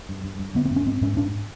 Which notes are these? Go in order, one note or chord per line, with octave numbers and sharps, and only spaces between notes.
G2
G2
G2
D3 B3
C4
G2
C#4
G#2 C4
G#2 C#4
G#2 D4